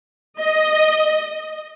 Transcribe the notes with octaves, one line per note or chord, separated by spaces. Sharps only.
D#5